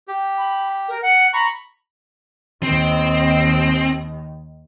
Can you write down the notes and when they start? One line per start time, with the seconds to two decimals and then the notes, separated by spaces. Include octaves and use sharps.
0.08 G4
0.38 B5
0.89 A#4
1.02 F#5
1.33 A#5 B5 C#6
2.63 D#2 D#3 C4